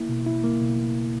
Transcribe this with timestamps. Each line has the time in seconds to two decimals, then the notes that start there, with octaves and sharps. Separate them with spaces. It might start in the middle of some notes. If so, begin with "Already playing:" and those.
Already playing: A#3 E4
0.09 B2
0.26 E4
0.44 A#3
0.61 B2